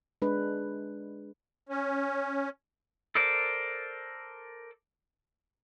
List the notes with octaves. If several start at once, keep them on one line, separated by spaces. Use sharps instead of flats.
G#3 D4 B4
C#4
A4 A#4 C5 D5